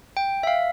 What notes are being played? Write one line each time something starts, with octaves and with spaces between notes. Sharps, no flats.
G5
E5
F5